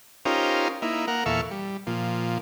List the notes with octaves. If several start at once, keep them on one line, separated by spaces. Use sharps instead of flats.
C#4 D#4 F4 G4 A#4 C5
A#3 D#4 E4
A#3 A#4 F#5
E2 A#2 A4 E5 F5 C#6
G3
A#2 F3